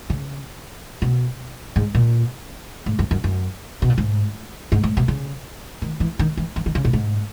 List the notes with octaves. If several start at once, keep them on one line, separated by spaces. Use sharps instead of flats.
C#3
B2
G#2
A#2
G#2
F#2
F#2
F#2
B2
A#2
G#2
G#2
G#2
B2
C#3
D#3
E3
D#3
E3
E3
D#3
C#3
A#2
G#2